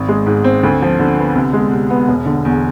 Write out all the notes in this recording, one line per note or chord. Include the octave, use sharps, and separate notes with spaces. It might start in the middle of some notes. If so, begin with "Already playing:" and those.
Already playing: G#1
G#3
G#2
C4
D2
F3
D3
B3
C2
G#3
C3
B3
E1
D3
E2